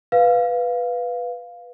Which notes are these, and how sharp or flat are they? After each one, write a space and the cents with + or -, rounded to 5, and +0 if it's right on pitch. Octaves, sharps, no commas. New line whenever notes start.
B4 +0 F5 +0